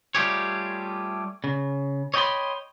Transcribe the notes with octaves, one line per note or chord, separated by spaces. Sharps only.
G3 A3 F4 G4 G#4 C#5
C#3
C#5 D#5 G5 A5 B5 C6